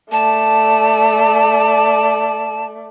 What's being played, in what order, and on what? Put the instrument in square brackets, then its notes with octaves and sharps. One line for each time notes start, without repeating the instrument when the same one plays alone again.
[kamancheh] A3 D5 [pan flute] A5